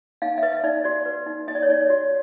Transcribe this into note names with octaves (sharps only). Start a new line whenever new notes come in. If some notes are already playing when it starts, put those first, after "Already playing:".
D#4 F5
E5
B4 D#5
D#4 D5
F#4 D5
B4
D#4
D#4 D#5
D5
C#5
D#4 D5
F#4